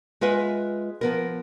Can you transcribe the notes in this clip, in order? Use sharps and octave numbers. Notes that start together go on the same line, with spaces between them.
G#3 F4 B4 E5
F3 B3 A#4